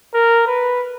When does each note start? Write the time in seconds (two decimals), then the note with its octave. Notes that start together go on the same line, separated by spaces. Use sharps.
0.15 A#4
0.47 B4